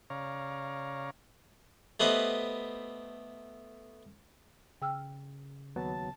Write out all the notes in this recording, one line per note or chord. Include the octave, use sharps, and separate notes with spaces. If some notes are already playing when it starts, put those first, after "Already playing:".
C#3 C#5 D5 F5 A#5
A3 B3 G4 B4 C5 D#5
C#3 G5 E6 F6
D#2 F#3 B3 A5